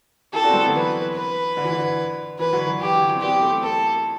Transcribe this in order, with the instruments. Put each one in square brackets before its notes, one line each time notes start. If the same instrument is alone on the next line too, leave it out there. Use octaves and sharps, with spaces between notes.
[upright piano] E4 G4 [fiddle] A4
[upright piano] D4 F#4
C4
G3 B3
D3 F#3
[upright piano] E3 [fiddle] B4
[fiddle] B4
[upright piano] D3
E3
D3
[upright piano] E3 [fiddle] B4
[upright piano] D3 F#3
E3
[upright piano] E3 [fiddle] G4
[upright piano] D3 F#3
E3
C4
[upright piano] B3 D4 [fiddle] G4
[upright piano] A3 C4
[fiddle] A4